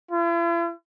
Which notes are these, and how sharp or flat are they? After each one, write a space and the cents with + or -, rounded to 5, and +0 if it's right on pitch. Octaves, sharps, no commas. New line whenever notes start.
E4 +45